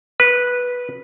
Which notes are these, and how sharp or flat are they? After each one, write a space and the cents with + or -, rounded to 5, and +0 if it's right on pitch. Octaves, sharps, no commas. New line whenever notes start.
B4 -10